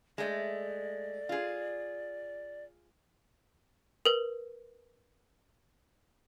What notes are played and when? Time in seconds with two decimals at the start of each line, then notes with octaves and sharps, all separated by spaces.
0.18 G#3 A3 D5
1.29 F4 G#4
4.05 A#4 B4